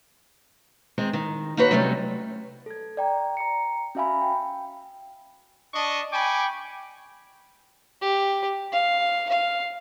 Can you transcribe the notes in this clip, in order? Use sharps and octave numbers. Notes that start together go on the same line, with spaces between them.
D#3 G#3 C4
D#3
A#3 D#4 F#4 B4 C#5
C3 F#3 G3 A3 C#4 D#4
A4 G#6
D5 G5 A#5
A#5 C#7
C#4 F#4 E5 F5 G#5 B5
G5
D4 D#5 A5 C#6 D#6
G5 G#5 B5 C#6 D6
G4
F5
F5